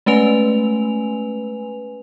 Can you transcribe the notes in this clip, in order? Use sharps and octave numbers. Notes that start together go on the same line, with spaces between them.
G#3 A3 C#4 B4 G#5 F7